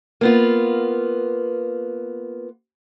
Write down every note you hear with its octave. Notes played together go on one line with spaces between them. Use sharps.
A#3 B3 F4